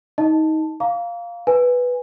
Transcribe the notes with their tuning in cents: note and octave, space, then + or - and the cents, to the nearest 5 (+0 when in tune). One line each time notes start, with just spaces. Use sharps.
D#4 +20 D#5 +5 A5 +0
F5 +0 A#5 +0 D6 -40
B4 +0 G#5 -20